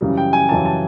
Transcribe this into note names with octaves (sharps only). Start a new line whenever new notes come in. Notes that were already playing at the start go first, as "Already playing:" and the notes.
F#2 C#3 E3 G3
G5
G#5
F#2 C#3 E3 G3 A5
A5